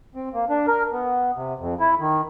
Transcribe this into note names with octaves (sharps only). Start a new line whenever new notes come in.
C4
A#3
D4
A#4
B3
C3
F2
E4
D#3